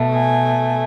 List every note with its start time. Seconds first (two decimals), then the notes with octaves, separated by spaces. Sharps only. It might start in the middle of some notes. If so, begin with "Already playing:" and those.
Already playing: B2 A3
0.16 G#5